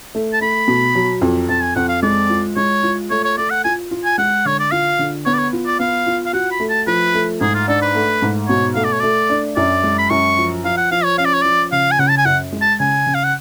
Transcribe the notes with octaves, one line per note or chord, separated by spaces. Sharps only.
A3
A5
A3 B5
B2
F#3
F2
F2 A5
G#5
F2 F#5
F5
G#3 D5
F4
G#3 C#5
F4
A3 C#5
C#5
A3 D5
F#5
F4 G#5
F4
G#5
G#3 F#5
D3 C#5
D5
F4 F5
D3
B3 C#5
D5
C#5
F4
D5
B3 F5
F4
F5
F#4 F#5
B5
A3
A5
F3 B4
A3
G#2 G#4
F4
D4 A4
B4
A3
G#2
B2 C#5
A3 F5
D5
C#5
A3 D5
D4
F#2 D5
G#3
B5
F#2 C#6
F3
F3 F5
F#5
F3 F5
C#5
C#4 F5
D5
C#5
F3 D5
C#3 F5
G#5
C#3 F#5
A5
G#5
F#2 F#5
G#3
A5
C#3 G#5
C#3
F5
F#5